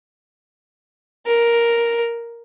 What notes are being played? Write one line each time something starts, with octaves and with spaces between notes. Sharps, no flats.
A#4